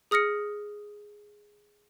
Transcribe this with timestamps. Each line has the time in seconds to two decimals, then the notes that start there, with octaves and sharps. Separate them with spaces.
0.11 G#4 D#6 F6 A#6 C#7